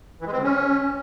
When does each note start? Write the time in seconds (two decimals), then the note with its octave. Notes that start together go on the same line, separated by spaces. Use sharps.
0.21 E3
0.27 G#3
0.32 C4
0.38 D3
0.43 C#4